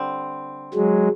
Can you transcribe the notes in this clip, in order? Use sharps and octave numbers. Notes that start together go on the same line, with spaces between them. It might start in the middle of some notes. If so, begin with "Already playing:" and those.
Already playing: D3 G3 C4
F#3 G#3